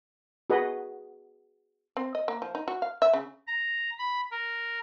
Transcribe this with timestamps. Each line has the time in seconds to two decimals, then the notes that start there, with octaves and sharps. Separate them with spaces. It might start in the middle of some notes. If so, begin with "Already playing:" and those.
0.50 F#4 G#4 B4 D#5
1.97 C4
2.15 D#5
2.28 A#3
2.42 F3
2.55 D#4
2.68 F#4
2.82 F5
3.02 E5
3.13 C#3
3.47 A#5
3.99 B5
4.31 A#4